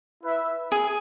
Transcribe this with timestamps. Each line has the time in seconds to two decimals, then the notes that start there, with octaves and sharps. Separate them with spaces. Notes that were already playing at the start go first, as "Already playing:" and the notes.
0.22 E4 B4 E5
0.72 G#4